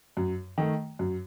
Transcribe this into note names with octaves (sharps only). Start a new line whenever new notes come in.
F#2
D#3 A3
F#2